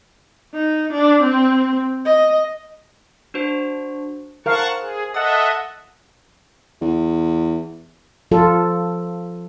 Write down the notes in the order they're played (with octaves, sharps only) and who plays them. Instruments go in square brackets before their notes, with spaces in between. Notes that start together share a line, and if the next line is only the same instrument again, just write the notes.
[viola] D#4
D4
C4
D#5
[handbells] D4 F#4 C5
[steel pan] A#4 F5 [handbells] C5 [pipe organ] F#5 A5 C#6
[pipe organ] G#4
[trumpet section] A4 F#5 [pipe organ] D#5 E5 [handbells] D#6
[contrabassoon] E2
[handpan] F3 F4 A4